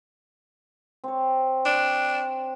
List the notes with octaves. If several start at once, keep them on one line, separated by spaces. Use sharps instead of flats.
C4 C#5
D4